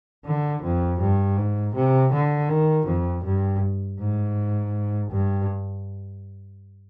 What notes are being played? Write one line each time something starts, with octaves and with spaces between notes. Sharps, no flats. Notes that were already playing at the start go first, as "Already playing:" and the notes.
D3
F2
G2
G#2
C3
D3
D#3
F2
G2
G#2
G2